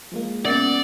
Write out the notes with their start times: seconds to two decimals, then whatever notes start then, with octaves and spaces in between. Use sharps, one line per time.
0.12 F3 G#3 A#3
0.45 B3 C#4 A#4 D5